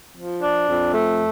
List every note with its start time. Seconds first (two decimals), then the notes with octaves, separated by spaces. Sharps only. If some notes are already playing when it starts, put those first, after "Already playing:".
0.16 F3
0.42 D4
0.68 F2
0.94 A3